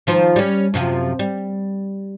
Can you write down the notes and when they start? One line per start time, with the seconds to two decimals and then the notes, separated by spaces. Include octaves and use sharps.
0.07 D#3 F3 C5
0.36 G3 C#4
0.74 F#2 C3 F3
1.19 G3